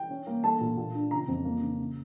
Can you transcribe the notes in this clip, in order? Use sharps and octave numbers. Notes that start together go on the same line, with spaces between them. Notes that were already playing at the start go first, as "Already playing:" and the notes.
Already playing: G5
C#4
A#3
A3 A5
A#2
A#2
D4
C#3 A#5
F2
A#3
C#3
C#3